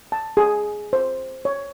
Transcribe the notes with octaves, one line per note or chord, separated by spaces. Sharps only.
A5
G#4
C5
C#5